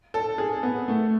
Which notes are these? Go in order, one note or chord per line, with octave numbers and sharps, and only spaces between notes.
A4
G#4
B3
A3